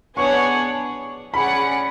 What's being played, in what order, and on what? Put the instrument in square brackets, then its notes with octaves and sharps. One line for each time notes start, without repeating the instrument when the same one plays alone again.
[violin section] B3 D4 G#4 C#5 F#5 [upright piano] C#6
[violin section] C#4 G#4 D5 F#5 [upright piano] B5